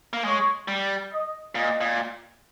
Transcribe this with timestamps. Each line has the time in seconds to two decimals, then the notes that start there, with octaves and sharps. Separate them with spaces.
0.13 A#3
0.25 G#3 C#5
0.68 G3
1.12 D#5
1.55 A#2 D#5
1.81 A#2